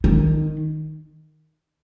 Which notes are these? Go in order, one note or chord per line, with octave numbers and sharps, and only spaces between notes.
D#3